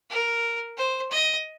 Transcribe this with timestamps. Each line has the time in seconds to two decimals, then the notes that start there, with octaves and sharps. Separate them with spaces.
0.10 A#4
0.77 C5
1.11 D#5